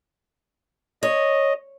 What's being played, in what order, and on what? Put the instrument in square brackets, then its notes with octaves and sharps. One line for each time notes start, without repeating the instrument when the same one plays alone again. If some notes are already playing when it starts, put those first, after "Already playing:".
[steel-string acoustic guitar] C#5 [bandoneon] D#5